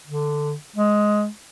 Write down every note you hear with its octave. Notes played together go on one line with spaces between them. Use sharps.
D3
G#3